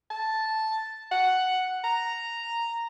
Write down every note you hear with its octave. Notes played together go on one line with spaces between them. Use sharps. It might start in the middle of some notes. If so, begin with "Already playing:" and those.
A5
F#5
A#5